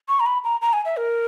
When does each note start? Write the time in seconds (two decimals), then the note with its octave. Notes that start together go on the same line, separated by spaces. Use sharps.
0.08 C#6
0.20 A#5
0.26 B5
0.44 A#5
0.62 A#5
0.73 G#5
0.85 E5
0.97 A#4